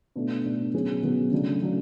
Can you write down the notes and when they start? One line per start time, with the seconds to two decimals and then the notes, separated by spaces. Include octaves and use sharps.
0.16 B2 A3 D4
0.45 B2 A3 D4
0.74 B2 F#3 C#4 G#4
1.03 B2 F#3 C#4 G#4
1.32 C#3 F#3 A3 D4
1.62 C#3 F#3 A3 D4